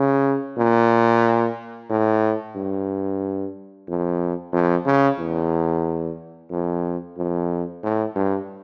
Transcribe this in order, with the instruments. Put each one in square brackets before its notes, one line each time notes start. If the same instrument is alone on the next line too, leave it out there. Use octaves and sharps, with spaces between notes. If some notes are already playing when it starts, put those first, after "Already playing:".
Already playing: [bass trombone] C#3
A#2
A2
G2
F2
F2
C#3
E2
F2
F2
A2
G2